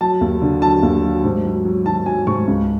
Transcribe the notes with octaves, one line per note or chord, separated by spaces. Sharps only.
F#3 A5
D#2
D3
F#3 A5
D#2
F#3
G#2
F#3
F#3
D#3 A5
F#3 G#5
G#2 C#6
C#2